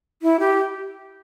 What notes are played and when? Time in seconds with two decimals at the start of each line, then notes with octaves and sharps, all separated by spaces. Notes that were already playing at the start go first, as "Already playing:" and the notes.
0.22 E4
0.40 G4